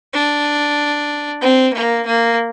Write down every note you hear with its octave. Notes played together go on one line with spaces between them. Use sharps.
D4
C4
A#3
A#3